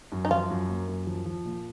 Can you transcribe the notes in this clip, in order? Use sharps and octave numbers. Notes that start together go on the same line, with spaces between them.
F#2
D#4
F3 F4
F#2
A#3
F#2
F3
F3
A#2